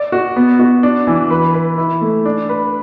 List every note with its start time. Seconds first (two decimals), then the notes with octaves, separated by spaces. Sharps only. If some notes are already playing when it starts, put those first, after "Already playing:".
Already playing: D5
0.12 F#4
0.36 B3
0.59 F#4
0.83 D4
1.07 E3
1.30 B4
1.54 B4
1.78 E4
2.01 A3
2.25 D4
2.49 B4